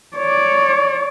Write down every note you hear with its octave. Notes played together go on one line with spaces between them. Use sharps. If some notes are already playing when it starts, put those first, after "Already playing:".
C#5 D5